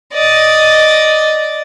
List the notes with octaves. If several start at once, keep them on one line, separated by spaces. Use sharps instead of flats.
D5 D#5